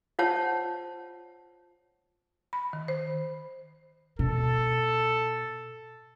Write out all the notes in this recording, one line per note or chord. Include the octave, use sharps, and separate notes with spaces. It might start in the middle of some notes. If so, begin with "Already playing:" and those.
F4 C5 C#5 F#5 A5
B5
D#3
C5
B2 A4